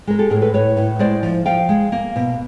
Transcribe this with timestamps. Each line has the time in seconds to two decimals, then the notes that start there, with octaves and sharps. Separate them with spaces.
0.07 G#3 A#4
0.19 G4 A4
0.30 A2 G#4 A#4
0.42 A4 B4
0.53 A2 B4 C#5
0.77 A2
0.99 G#3 C5 D5
1.23 F3
1.46 F3 F5 G5
1.69 G#3
1.92 A#3
2.16 B2